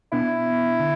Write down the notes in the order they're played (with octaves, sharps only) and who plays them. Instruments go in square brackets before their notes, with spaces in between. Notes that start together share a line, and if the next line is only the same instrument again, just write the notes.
[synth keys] B2 B3 D4 [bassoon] E4
[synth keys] D3